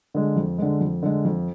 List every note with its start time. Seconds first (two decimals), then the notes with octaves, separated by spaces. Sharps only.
0.14 D3 G#3
0.36 F2
0.58 D3 G#3
0.81 F2
1.02 D3 G#3
1.25 F2